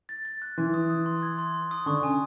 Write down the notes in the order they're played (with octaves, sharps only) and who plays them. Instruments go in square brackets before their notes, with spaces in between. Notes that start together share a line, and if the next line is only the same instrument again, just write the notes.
[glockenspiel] A6
A6
F#6
[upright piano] E3 [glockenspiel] C6
[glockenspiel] D#6
D#6
C6
G#6
C6
C6
D#6
[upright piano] D3 [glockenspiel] C#6
[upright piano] C#3 [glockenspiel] G#5